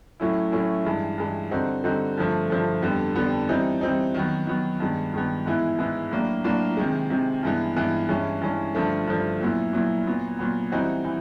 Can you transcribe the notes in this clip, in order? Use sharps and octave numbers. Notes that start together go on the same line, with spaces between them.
A2 F#3 A3 C#4 E4
A2 F#3 A3 C#4 E4
G2 E3 G#3
G2 E3 G#3
D3 G3 C4 D#4 F#4
D3 G3 C4 D#4 F#4
G2 D3 F3 A3
G2 D3 F3 A3
F2 D3 G3 B3
F2 D3 G3 B3
E3 G3 C4 D#4
E3 G3 C4 D#4
D#3 F#3 B3
D#3 F#3 B3
G2 D#3 G#3 B3
G2 D#3 G#3 B3
G#2 E3 G#3 B3 E4
G#2 E3 G#3 B3 E4
A2 F#3 A#3 D4
A2 F#3 A#3 D4
C3 D#3 G#3
C3 D#3 G#3
G2 E3 G#3 B3
G2 E3 G#3 B3
G2 E3 G#3 C#4
G2 E3 G#3 C#4
G2 D3 F3 A3
G2 D3 F3 A3
A#2 F#3 B3 E4
A#2 F#3 B3 E4
A#2 F#3 B3
A#2 F#3 B3
E3 G3 C4 D#4 F#4
E3